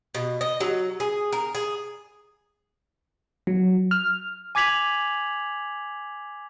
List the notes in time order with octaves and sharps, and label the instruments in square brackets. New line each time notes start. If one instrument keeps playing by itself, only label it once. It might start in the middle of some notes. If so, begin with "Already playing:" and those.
[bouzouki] B2
D#5
F#3
G#4
A#4
G#4
[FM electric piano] F#3
F6
[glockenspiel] G#5 D6 G#6 B6 F7 F#7